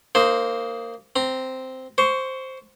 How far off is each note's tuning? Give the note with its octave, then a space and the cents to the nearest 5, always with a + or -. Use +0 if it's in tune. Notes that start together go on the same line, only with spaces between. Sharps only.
A#3 -15 D#4 +0 C5 +0
C4 -5 A#5 +0
C5 +0 C#6 +20